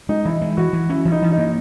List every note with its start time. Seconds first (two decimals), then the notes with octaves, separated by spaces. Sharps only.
0.09 G#3 D#4
0.25 E3 E4
0.42 G#3
0.57 E3 F#4
0.73 E3
0.89 C#4 E4
1.05 E3
1.12 D#4
1.22 E3
1.32 D#4
1.38 A#3